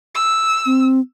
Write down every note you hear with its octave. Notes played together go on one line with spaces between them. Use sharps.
E6
C4